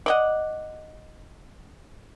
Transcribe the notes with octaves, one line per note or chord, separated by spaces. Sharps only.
D5 D#5 F#5